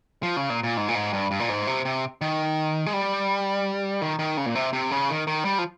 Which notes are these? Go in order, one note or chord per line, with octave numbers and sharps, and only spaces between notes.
F3
C#3
A#2
A#2
G#2
A#2
G#2
G2
G2
A#2
G#2
C3
C3
D#3
G#3
G3
D#3
D#3
C#3
A#2
C3
C3
C#3
D#3
D#3
G3
F3